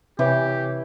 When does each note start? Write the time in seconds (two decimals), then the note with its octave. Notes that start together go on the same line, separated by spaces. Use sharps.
0.19 C3 E3 G4 C#5